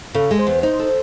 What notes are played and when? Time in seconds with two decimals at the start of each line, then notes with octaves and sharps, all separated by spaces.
0.15 C#3 A4
0.31 G#3
0.39 C5
0.47 E2
0.63 D#4 C5
0.79 A4